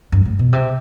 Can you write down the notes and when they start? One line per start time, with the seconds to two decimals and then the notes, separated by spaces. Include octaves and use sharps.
0.12 G2
0.25 A2
0.39 B2
0.53 C3